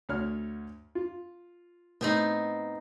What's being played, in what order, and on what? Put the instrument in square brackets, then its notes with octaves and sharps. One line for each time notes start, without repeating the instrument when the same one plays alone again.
[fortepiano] D2 C#5 F6
F4
[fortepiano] A2 [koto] B3 C4 D#4